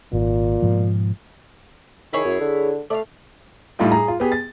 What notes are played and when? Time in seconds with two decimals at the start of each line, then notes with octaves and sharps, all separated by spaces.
0.13 G#1 A#2
0.62 G#2 B2 F3
2.13 D#3 E4 G#4 C#5
2.25 F#2
2.41 D3
2.90 A3 D5 F5
3.79 A2 G3 D#4 F4 G4
3.92 G#4 A#5
4.08 F4
4.20 B3 G4 G#4
4.32 A6